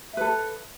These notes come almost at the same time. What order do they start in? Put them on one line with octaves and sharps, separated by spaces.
E5 B4 A4